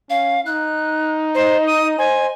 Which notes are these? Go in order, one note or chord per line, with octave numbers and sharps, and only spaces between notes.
C#4 F5
D#4 F#6
C5 D#5
D#6
C5 G#5